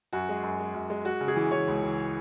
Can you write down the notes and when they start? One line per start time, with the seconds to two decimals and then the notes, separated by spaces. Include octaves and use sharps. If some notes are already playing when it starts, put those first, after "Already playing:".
0.13 F#2 F#4
0.29 G#3
0.43 F#2
0.59 G#3
0.74 F#2
0.90 G#3
1.05 G#3 F#4
1.21 C#3
1.28 G#4
1.36 E3
1.51 E3 C#5
1.68 C#2
1.83 E3